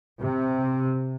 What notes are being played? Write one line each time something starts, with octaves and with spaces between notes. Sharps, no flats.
C3